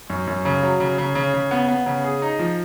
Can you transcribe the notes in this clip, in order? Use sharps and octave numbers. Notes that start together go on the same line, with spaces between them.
F#2
F#2
C#3
F#3
C#3
C#3
C#3
C#3
B3
B3
C#3
G#4
D#4
F3